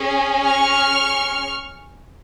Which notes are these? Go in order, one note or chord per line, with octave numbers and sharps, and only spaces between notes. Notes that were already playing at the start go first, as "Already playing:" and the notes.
Already playing: C#4 G#4
C#6 F6